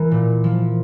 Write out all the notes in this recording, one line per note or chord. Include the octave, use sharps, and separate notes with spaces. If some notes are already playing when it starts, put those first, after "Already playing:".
Already playing: E3 A#4
A#2
F3